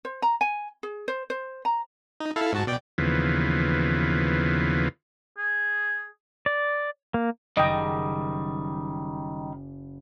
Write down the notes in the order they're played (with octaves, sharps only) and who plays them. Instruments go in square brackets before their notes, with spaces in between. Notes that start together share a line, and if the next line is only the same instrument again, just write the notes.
[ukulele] C5
A#5
G#5
G#4
C5
C5
A#5
[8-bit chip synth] D#4
E4 A4 F5
G#2 F#4 A5
B2 D5 G5
[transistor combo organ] D#2 C#3 E3 F3 B3
[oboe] G#4
[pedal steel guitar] D5
A#3
[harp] F#1 [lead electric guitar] D#3 G3 [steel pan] D#5 G5